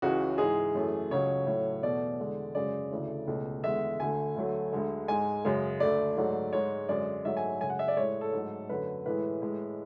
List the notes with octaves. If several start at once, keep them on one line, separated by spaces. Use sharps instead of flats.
C#2 C#3 E3 F#4
G#2 E3 G#3 G#4
F#2 E3 A3
C#2 C#3 F#3 C#5
A2 F#3 A3
E2 B2 A3 D5
E2 D3 G#3
F#2 C#3 G#3 D5
D2 C#3 E3 A3
C#2 B2 A3
E2 D3 G#3 E5
D2 D3 A3 G#5
D2 D3 F#3 A3
D2 D3 G#3
G#2 G#3 G#5
F#2 C#3 G#3
D2 D3 A3 D5
G#2 F#3 A3
G#2 G#3 C#5
F#2 D3 G#3 D5
G#2 F#3 A3 E5
G#5
F#2 C#3 G#3 G#5
F#5
E5
D5
A2 G#3 C#5
A4
G#2 F#3 A3
F#2 D3 F#3 A3 B4
A2 E3 G#3 B4
A2 G#3